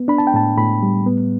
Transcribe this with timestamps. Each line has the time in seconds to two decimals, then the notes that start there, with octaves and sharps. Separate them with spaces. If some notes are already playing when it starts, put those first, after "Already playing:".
Already playing: B3
0.08 D4 B5
0.18 A5
0.27 G5
0.34 A2 A5
0.57 A2 B5
0.83 G3
1.06 B3